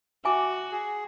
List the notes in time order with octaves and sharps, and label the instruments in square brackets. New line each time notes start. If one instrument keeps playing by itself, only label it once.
[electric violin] F#4 [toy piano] E5 G#5 D6
[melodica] G#4